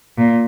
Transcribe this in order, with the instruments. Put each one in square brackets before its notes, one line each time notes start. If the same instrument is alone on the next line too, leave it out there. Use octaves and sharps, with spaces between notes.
[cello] A#2